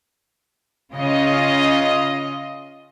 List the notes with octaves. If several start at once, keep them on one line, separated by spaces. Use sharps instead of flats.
C#3 F4 D#5